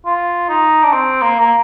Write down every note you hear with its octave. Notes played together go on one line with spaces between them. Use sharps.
F4
D#4
D4
C4
A#3
A#3